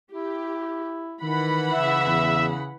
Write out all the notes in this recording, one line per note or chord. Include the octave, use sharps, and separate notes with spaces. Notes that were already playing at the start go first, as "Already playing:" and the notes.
E4 G4
D#3 E3 F#5 B5
C#3 E5
E2